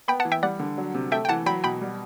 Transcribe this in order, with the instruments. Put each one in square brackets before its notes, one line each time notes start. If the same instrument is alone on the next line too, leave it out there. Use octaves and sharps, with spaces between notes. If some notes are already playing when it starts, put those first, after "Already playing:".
[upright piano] B3 [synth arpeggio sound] G5 B5
[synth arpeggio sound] F#5 A5
[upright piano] E3
[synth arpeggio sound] E5 G5
[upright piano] G3 [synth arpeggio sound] D5 F#5
[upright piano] D3
F#3
C3
[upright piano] A3 [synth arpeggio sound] E5 G5
[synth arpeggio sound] G5
[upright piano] E3 [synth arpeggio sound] F#5 A5
[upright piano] F#3 [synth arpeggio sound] G5 B5
[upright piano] B2 [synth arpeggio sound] G5 B5
[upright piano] G3